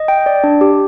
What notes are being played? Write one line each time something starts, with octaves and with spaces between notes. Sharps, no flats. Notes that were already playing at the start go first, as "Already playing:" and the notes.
Already playing: D#5
G5
D5
D4
G4